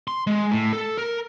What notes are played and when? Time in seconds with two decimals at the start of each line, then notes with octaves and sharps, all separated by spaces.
0.08 C6
0.27 G#3
0.51 A2
0.73 A4
0.97 A#4